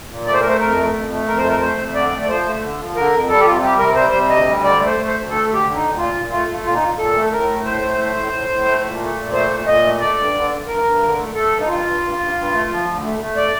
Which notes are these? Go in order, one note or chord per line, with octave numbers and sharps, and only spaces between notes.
A#2
A3 D5
C5
A3 A#4
C5
F2 A#4
A3
F2
A3
F2 A#4
C5
A3 A#4
A3 C5
F2
D3 D5
A3
D5
F3 C5
A3
D3
F3
D3 A#4
F2
G3 A4
G4
C3 F4
G3 G4
C3 A#4
G3 C5
C3
D2 D#5
G3
D3 D5
A3
C5
A3
C5
D2
A3 A4
D2
G4
D3
D#4
D2
A#2 F4
A#2
A3 F4
A3
A#2 F4
D#4
A#2 F4
A#2 A4
A3
A2 A#4
A3
A2 C5
A3
A2
A2
A2
A2
A3
A#2
A3
A#2
A3 C5
A#2
A#2 D#5
A3
A3 D5
G2
D3
G2
G2 A#4
G2
D3
A3
A3 A4
G2
D#4
G2 F4
G2
G2
G2
G2
A3
F3
D2
A3
A3
D5